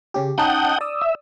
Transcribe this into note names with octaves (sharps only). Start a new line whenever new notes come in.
C#3 C#4 G4
C#4 D#4 F#5 G5 A5 D#6
D5 D#6 E6
E5